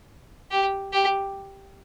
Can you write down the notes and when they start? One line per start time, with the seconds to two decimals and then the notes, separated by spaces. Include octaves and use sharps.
0.51 G4
0.93 G4